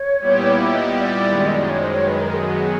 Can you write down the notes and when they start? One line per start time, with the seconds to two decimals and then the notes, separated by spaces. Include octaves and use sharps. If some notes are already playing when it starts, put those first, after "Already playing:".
Already playing: C#5
0.19 A#2 G3 B3 E4 G4
0.73 D#5
1.00 D5
1.27 F#2 D#3 G#3
1.46 D#5
1.58 D5
1.70 C#5
1.81 C5
1.94 C#5
2.08 B4
2.21 A#4
2.34 D#3 F#3 B3 G#4